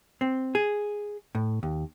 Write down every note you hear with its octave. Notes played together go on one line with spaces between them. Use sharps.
C4
G#4
A2
D#2